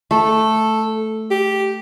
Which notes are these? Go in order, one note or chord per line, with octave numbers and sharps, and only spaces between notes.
A3 A4
G4